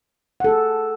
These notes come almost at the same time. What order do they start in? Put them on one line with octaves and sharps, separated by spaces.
F#5 A4 G#4